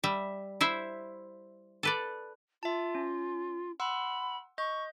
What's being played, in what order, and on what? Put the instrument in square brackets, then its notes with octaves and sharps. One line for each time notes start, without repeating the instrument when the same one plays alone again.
[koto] G3 E5
E4 C5 E5
A4 B4 D5
[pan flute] F4 [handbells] E5 A5
[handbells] C#4
[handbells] F#5 C6 E6 [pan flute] B5
[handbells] D#5 G6 [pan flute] C#6